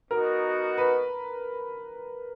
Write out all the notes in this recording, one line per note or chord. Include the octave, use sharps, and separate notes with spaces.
B3 D#4 F#4 A#4
B4